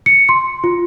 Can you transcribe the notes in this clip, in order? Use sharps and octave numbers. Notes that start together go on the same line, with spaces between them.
C#7
C6
F4